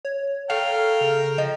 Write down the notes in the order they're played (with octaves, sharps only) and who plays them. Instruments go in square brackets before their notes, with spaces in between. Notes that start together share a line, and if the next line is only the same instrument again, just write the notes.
[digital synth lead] C#5
[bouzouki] A3 [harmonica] A#4 G5 [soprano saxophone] F5
[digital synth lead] C#3
[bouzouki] F3 [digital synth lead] D#5